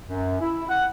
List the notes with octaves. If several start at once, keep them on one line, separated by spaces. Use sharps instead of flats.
F#2
E4
F#5